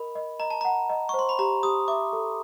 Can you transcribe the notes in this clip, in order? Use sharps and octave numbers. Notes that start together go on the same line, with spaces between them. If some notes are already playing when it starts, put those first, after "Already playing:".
Already playing: A#4 D#5 B5
D#5
D#5 A#5
A5
F#5 A#5
D#5
C5 C#6
C6
B5
G4 A#5
G4 D#6
E5 D6
A4